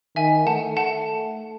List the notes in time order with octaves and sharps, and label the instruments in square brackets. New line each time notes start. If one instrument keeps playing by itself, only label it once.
[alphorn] D#3 [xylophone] E5 G#5
[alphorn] A3 [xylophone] F#5 A5
[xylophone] F#5 A5